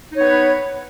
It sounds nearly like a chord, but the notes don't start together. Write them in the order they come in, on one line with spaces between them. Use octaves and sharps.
D#4 C#5 B3 B4